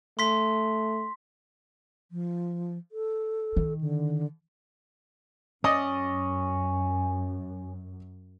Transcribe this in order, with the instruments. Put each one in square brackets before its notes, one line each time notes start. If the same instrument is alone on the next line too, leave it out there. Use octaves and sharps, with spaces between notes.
[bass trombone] A3 [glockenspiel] C6 B6
[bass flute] F3
A4
[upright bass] D#3
[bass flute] D3
[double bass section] F#2 [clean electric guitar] C#4 [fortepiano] D5 D#5 D#6